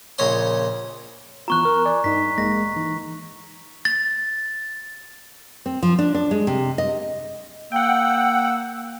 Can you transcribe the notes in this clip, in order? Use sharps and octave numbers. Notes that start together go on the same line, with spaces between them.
A#1 C#3 C#5 D#5 C6
E3 B3 F4 A#5 C#6 F#6
A#4
D5 G#5
G2 D#4 B6
A1 G#3 A#3 A#6
E3 D#4
A6
C4
F3
D4
D4
G#3
C3
D#5
A#3 F#5 G5 E6